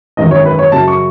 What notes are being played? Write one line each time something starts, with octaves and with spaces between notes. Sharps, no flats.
G#1 F#2 D#3 G#3 D#5
C#5
B4
C#5
F#2 C#3 F#3 A5
C#6